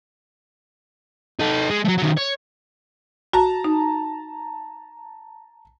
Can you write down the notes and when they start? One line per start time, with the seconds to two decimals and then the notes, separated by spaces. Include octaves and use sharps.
1.40 D#4 A4
1.70 G#3
1.85 F#3 A3
1.98 D#3 F#3
2.17 C#5
3.33 F#4 A5 A#5
3.64 D#4